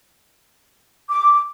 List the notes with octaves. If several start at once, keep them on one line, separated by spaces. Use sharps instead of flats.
D6